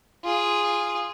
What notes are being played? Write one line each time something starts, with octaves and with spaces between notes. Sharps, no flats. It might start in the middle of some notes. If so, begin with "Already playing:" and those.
F4 G#4